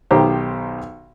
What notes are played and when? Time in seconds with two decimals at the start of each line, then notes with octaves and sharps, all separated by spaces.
0.11 B1 D#3 G4 C5 A#5